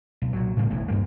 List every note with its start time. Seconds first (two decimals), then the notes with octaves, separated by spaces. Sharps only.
0.22 B1
0.33 A#2 F#3
0.57 A2 C#3 G3 A#3
0.70 E1 A1 D#2 E3
0.88 D2 G2 F#3 A#3